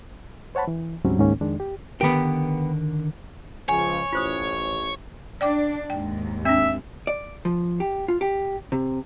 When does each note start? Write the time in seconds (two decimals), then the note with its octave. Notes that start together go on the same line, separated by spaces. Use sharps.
0.55 C5 C#5 F#5 A5 B5
0.68 E3
1.04 D2 G#2 F#3 G3 C4 C#4
1.19 C#2 G#2 D#3 A#3 C#4
1.41 F2 D#3 G#3 D4
1.60 G4
2.01 D3 D#3 B3 G4 A#4
3.69 C#2 C#3 F3 C#5 G#5
4.13 A1 F4 C5 D#6
5.41 D4 D5 G5 D6
5.90 D#2 G#2 G5
6.45 C4 D4 E5
7.07 D5
7.45 F3
7.80 G4
8.08 F4
8.21 G4
8.72 C3